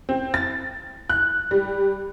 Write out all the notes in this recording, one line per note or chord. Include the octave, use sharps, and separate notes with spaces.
C4
A6
F#6
G3